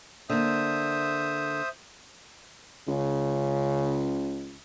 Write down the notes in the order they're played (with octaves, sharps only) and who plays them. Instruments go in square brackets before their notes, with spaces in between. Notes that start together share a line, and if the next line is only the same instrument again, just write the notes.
[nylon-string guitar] D3 A#3 [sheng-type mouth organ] C5 E5 D#6
[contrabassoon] C#2 [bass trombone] C#3